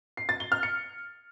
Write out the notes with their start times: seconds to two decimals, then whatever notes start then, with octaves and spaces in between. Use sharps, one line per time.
0.17 C7
0.29 A6
0.40 G7
0.52 F6
0.63 C#7